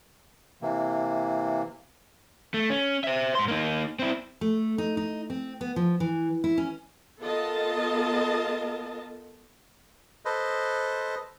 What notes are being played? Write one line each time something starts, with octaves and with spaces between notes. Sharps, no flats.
C3 E3 A#3
A3
C#4
C5 E5
G#2 C6
A#3 D#4
C4 E4
A3
D#4
D#4
C4
B3
F3
E3
E4
C#4
B3 F4 A4 A#4 D#5 A5
A4 B4 C5 D#5